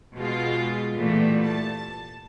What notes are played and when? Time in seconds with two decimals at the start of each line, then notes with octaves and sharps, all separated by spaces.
0.15 B2 G#3 F4
0.95 A#2 E3 G3 A3 B3
1.47 A5